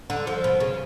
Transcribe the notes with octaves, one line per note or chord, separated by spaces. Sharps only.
D3
F3
B2
C#3